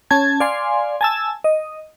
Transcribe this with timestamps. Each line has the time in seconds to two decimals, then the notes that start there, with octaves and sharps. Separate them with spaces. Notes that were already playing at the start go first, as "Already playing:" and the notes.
0.11 C#4 A5 G#6
0.40 D5 F5 G#5 C6
1.01 G#5 A5 E6
1.44 D#5